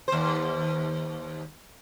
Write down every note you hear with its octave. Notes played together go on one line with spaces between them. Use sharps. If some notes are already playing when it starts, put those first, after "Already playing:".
D#2 C5